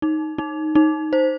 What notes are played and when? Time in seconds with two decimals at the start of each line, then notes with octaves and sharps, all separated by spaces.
0.02 D#4
0.38 D#4
0.75 D#4
1.13 C5